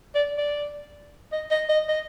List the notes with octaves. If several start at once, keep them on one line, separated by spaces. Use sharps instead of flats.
D5
D5
D#5
D#5
D#5
D#5